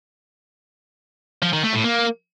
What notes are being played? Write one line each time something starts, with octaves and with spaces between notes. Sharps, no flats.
F3
D#3
A3
A2
A#3